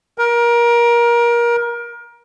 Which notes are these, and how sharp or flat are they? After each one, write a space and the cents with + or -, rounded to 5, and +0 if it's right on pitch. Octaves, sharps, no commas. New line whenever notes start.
A#4 +25